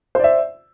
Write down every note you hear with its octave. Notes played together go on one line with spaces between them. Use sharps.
C5 D5 E5